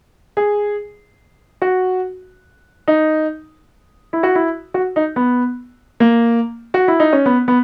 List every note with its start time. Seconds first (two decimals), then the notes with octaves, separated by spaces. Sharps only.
0.37 G#4
1.62 F#4
2.88 D#4
4.13 E4
4.23 F#4
4.35 E4
4.74 F#4
4.96 D#4
5.16 B3
6.00 A#3
6.74 F#4
6.88 E4
7.00 D#4
7.13 C#4
7.26 B3
7.48 B3